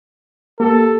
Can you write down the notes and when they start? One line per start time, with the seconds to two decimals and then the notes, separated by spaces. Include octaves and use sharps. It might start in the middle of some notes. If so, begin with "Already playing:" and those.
0.60 A#3 G4 A4